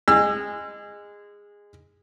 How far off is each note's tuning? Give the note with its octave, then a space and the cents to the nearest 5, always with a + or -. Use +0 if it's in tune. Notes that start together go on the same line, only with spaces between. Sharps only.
G#3 -20 E6 +40